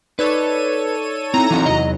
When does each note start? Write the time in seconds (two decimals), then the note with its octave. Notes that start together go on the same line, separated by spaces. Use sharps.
0.19 D#4 A4 B4 C#5 D5 D#7
1.34 C4 D#4 E4 A#5
1.50 E3 F#3 C4
1.66 E2 C3 F#3 E4 D#5